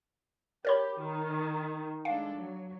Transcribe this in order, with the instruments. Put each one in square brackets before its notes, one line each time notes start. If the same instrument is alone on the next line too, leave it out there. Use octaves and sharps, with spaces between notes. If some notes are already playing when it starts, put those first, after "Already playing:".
[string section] G4 [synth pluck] A#4 C#5 B5
[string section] D#3
[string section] G#3 D4 A4 [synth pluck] F5
[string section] F#3